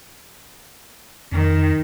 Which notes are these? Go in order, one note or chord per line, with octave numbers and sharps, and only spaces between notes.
F2 D#3